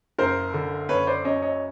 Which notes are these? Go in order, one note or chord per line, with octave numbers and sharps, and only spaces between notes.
F#1 A#4 C5
D3
F#1 B4 C#5
C5 D5
F#2 C#5 D#5
C#5 D#5